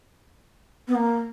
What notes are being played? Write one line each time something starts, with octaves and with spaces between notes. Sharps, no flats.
B3
A#3